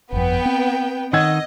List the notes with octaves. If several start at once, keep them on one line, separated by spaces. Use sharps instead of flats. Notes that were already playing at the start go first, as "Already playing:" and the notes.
G1 F2 B3 G5
C4
D#3 D#5 F#5 E6 G#6